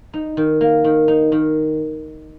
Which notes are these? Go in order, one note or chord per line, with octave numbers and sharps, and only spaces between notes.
D#4
D#3
A#3
D#3
D#4
D#3